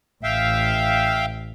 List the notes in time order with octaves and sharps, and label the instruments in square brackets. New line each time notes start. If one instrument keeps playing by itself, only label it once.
[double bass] A1 [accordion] E5 F5 G5